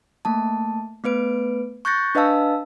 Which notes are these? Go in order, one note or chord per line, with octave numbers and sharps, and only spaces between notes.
A3 A#3 A5
A3 B3 B4 D7
C#6 F#6 G6 A6 A#6 C#7
D4 B4 D#5 F5 A5 E6